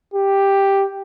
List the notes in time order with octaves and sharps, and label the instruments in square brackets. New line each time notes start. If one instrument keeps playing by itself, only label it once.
[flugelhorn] G4